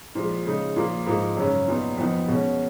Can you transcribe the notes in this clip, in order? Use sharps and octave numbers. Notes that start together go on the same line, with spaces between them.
A#2 F3 G#3
C#3 G#3 D#4
A#2 F3 A#3
G#2 F3 A#3 D#4
F#2 C#3 G#3 C#4
A#2 F#3 B3 D#4
F2 F3 B3 D#4
B2 G#3 C#4